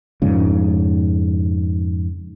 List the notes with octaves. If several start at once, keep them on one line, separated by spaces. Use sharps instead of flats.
F2 G#2 C#3